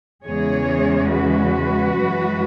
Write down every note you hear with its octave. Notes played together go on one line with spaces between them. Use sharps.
E2 C#3 E3 G#3 G#4 C#5
F#4 B4
F#2 E3 G#3